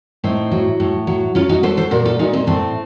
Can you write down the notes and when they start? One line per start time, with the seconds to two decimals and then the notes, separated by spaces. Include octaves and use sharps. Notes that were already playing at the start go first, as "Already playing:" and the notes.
0.24 A2 C4 D#4
0.52 F#3
0.80 A2
1.07 F#3
1.35 F#3 C#4 F4
1.49 D#4 F#4
1.63 F#3 A4 C5
1.77 A4 C5
1.91 A#2 F#4 A#4
2.05 F4 A4
2.19 A#2 D#4 F#4
2.33 C4 D#4
2.47 A2 A3 C4